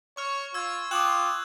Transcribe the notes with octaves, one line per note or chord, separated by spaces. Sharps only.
C#5 C#6 F6
F4 E6 G#6
F4 G5 D6 D#6 F#6 E7 F#7